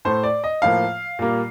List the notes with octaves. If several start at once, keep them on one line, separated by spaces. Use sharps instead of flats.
A2 A3 C5
D5
D#5
A2 F3 A#3 F5
A#2 G3 A#3